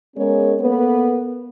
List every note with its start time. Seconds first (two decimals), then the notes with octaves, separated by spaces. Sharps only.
0.17 G#3 B3 C#4 G#4 A#4 C#5
0.61 A#3 B3 A4 B4